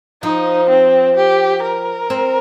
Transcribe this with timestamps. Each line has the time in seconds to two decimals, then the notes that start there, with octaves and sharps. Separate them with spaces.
0.23 F3 D#4
0.70 C4
1.16 G4
1.63 A#4
2.10 C4